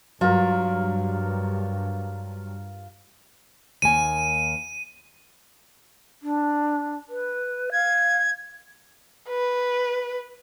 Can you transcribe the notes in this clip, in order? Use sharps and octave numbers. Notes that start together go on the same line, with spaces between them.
G2 F#3 F4 A#4
D#2 A#3 G#5 D#7
D4
B4
F5 G#6
B4